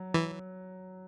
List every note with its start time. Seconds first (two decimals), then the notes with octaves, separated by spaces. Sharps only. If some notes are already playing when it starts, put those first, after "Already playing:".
Already playing: F#3
0.14 E3